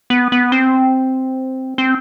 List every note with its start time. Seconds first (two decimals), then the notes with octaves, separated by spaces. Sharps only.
0.10 B3
0.32 B3
0.52 C4
1.78 C4